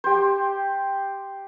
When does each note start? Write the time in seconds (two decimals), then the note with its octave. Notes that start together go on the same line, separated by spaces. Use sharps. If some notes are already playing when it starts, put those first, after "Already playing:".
0.04 G4 C5